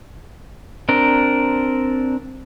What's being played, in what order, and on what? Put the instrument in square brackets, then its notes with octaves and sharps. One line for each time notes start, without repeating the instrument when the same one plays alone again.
[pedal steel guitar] C4 D4 A#4